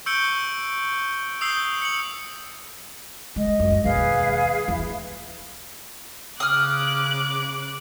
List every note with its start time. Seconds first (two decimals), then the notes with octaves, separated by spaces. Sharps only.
0.06 C#6 E6 G6 C#7 D7 G7
1.41 D#6 E6 G6 C7 G7
1.82 C#7 F#7
3.36 G#3 D#5
3.60 F#2
3.84 E1 D#2 G#4 B4 F5
4.68 E2 E4
6.40 C#3 D6 D#6 F6 F#6